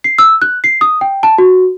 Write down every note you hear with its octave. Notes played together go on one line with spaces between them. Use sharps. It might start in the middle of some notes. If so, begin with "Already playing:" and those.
C7
E6
F#6
C7
D#6
G5
A5
F#4